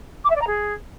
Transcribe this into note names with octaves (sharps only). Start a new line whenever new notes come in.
D6
E5
D5
A#5
G#4